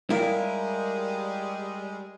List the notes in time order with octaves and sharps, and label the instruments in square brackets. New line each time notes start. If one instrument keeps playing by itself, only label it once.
[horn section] G3 G#3 [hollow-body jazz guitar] E4 A#4 [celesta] E5 F5 G5